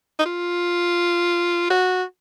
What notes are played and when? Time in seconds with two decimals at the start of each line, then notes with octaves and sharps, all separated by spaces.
0.19 D#4
0.25 F4
1.70 F#4